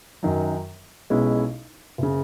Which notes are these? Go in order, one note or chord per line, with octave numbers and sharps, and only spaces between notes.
F#2 D#3 F#3
B1 B2 G#3 C#4 E4
F#1 C#3